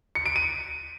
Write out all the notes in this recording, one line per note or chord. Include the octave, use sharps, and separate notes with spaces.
C#7
D7
D#7